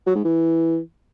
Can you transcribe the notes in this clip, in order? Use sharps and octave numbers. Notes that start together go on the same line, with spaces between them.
F#3
G#2
E3